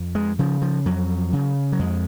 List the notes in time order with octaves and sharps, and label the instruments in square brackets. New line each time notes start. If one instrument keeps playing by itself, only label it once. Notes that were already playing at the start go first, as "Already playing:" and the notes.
Already playing: [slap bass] F2
G#3
C#3 F3
F3
F2 F#3
C#3
F#3
F2 G#3